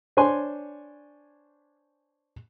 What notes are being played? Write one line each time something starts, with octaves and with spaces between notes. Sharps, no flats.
D4 C5 C#5 G#5 C6